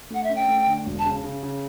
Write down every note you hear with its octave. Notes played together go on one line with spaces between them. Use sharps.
A3 F#5
E5
C#4
G5
A3
D3
E1
A5
C#3
C#3
C#3